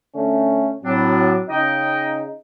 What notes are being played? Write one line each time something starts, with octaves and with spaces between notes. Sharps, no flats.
D3 A3 C#4
A2 F#3 C4 D4
C#3 D#4 D#5 G5